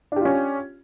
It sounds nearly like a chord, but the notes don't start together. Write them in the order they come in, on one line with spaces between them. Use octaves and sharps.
D4 G4 F4 C#4